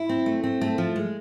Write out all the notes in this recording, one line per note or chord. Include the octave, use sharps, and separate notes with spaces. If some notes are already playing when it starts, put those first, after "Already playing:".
Already playing: E4
C4
A3
C4
A3
F3
G#3